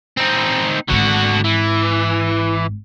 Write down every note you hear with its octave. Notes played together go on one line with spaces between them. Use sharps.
C4 D#4
G#1 G#2 D3 F#4
E3